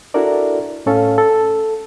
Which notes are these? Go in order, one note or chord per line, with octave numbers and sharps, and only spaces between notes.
D4 E4 F#4 A4 A#4 D5
A2 C#4 A4 F5
A4